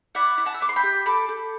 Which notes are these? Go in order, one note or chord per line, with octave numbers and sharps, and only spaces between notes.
E4 D5 F#5
E4
F#5 A5
E6
B3 D6
C6
G5 B5
G4
A4 B5 D6
A4